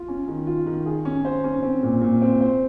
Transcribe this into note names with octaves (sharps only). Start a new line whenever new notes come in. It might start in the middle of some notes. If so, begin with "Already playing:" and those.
Already playing: F4
C#4
D#3
F4
D#3
G#4
C#4
C5
C#4
C4
A#2
A#2
C4
C5